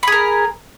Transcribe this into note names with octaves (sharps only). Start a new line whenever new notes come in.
G#4 A#4 B5